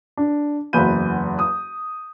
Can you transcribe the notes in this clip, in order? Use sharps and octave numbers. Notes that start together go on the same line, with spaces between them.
D4
F#1 E2 F#5 B5 G6 D#7
D#6